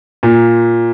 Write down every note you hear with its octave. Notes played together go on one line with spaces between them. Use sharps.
A#2